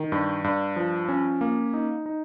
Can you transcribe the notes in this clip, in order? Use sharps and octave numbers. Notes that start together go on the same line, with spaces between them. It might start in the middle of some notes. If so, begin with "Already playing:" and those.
Already playing: D#3
G2
G2
F3
C#4
A#3
D#4
D#4